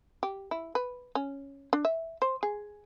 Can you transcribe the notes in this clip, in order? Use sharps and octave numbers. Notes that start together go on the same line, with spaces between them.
G4
E4
B4
C#4
D4
E5
C5
G#4